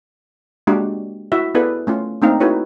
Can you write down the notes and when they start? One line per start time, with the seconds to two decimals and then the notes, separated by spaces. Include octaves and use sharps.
0.67 G#3 A#3 D4 F#4 G4
1.32 E4 F#4 E5
1.54 B3 E4 G#4 A4 B4 D5
1.87 A3 C#4 F4
2.22 A3 A#3 C4 D4 D#4 F5
2.40 D#4 E4 F#4 A4 B4 C#5